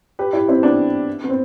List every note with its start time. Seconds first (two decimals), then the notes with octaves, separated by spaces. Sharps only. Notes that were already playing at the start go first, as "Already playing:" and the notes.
0.19 G4 B4
0.33 E4 G4
0.48 C4 E4
0.63 B3 D4
1.24 B3
1.29 C4